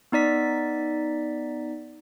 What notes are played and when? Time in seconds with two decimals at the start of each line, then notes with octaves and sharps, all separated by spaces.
0.12 B3 D#4 D5 B6